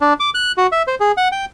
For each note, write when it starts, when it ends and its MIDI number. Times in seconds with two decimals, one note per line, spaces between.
0.01 0.13 62
0.20 0.30 86
0.35 0.52 90
0.57 0.67 66
0.72 0.82 76
0.87 0.95 72
1.00 1.12 68
1.17 1.28 78
1.32 1.45 79